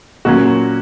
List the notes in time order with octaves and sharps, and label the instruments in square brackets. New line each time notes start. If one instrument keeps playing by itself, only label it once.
[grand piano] A#2 F#3 A#3 C#4 F#4